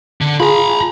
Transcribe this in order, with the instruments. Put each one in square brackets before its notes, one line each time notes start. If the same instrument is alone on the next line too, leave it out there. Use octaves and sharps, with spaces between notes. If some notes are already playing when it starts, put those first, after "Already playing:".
[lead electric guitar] D3
[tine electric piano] F4 G#4 [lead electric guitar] A#5 B5